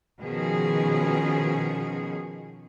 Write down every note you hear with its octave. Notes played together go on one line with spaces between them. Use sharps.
B2 D#3 F3 C#4 G#4